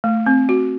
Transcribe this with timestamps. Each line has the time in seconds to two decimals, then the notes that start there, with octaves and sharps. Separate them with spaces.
0.04 A3
0.26 C4
0.49 F#4